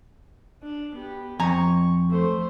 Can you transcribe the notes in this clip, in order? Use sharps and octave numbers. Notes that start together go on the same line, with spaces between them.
D4
B3 G4
F2 G#5 A#5 C#6
A3 C5